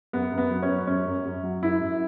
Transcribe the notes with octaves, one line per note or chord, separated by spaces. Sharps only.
F#2 B3
F#2
B3
F#3
C#4
F#3
F#2 C#4
F#2
F#2
F#3
F#2 E4
F#2